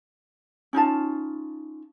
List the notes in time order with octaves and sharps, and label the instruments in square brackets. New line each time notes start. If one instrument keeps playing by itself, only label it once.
[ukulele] C#4 D#4 F4 A5